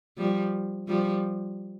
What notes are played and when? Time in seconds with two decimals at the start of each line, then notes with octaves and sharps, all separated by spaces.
0.17 F3 G3
0.88 F3 G3